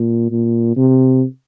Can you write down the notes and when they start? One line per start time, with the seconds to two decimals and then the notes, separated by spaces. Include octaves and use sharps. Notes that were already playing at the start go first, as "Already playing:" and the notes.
Already playing: A#2
0.31 A#2
0.77 C3